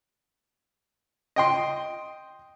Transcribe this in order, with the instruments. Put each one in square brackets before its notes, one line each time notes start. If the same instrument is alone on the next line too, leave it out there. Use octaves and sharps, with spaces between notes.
[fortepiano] D#5 G5 C6